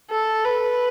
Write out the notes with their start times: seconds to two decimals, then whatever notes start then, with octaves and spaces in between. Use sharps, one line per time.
0.10 A4
0.44 B4